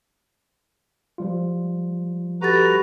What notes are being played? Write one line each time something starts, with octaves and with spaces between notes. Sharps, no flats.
F3 G3 F4
F#4 G4 A4 B4 A#5 A6